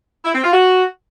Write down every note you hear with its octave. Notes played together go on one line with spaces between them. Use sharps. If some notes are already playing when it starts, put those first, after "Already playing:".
E4
C4
F4
F#4